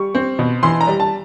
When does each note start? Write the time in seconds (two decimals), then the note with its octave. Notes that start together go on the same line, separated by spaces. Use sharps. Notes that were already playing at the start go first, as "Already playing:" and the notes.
Already playing: G3 C#6
0.15 C4
0.39 B2
0.63 E3 C6
0.81 A#5
0.87 G3
1.00 A5